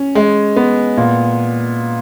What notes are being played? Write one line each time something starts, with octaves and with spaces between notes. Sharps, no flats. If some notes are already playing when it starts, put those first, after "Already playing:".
Already playing: C#4
G#3
B3
A#2